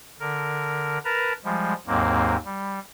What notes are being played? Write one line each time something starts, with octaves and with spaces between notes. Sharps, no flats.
D3 A#4
A#4 B4 A5 A#5
F3 G3 G#3
D#2 G#2 F#3 A#3 C4
G3